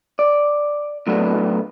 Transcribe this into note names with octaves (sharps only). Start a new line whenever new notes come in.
D5
A2 F#3 A3 B3 D4